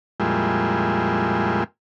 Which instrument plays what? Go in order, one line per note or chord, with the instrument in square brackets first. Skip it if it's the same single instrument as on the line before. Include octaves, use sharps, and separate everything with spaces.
[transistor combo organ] F2 A#2 G3 G#3 E4